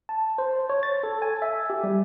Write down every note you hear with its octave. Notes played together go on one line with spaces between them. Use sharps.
A5
C5
C#5
A6
A4
G#5
E5
G4
G3